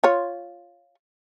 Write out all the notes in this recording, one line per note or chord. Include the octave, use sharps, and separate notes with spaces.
F4 C#5